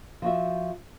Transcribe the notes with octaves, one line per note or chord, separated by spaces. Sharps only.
F3 F#4 E5